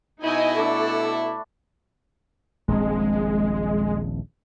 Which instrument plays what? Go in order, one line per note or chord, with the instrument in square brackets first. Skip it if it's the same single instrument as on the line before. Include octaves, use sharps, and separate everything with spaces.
[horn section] B2 E4 [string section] D#4 D#5 G#5
[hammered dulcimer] A3 D4 D5 [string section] A4
[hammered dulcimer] B5
[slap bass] D#1 A#1 C4 [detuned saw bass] G#3